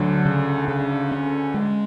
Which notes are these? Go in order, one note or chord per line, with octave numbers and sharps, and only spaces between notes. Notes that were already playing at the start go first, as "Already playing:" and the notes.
Already playing: D2 D3 F#3
C#3
C#3
C#4
G#3